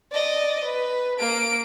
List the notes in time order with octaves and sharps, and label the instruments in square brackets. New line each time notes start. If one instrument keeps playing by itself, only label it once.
[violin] D5 D#5
B4
A#3 D7